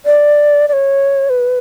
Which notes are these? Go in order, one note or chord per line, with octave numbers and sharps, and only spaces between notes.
D5
D5
C#5
B4